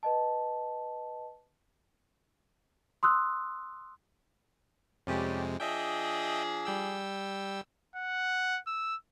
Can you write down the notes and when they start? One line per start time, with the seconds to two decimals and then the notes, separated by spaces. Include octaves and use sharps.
0.03 B4 D#5 A5
3.03 C6 D#6 E6 F#6
5.07 F2 C3 G3 G#3 C#4 G4
5.60 F3 D4 G#4 D#5 E5 G5
6.65 G3 G5 E6
7.96 F#5
8.67 E6